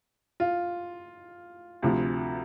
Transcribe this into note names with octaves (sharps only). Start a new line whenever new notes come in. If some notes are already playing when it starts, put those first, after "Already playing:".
F4
D2 C3 F3